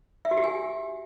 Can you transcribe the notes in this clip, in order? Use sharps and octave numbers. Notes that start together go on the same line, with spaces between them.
E5
F#4
G4
G#5